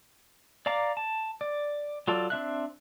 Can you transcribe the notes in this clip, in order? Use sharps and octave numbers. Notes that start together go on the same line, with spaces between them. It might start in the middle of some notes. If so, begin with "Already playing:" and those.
D5 F5 A#5 D6
A5
D5
F#3 F4 A4 D5
C4 D4 E5 F#6